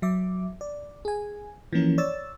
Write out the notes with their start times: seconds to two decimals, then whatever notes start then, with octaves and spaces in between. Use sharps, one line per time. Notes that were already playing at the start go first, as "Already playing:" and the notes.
0.02 F#3 E5 D6
0.61 D5
1.05 G#4 G#5
1.73 E3 F3 A#3 C#4 A#4
1.98 C#5 D5 E6 A6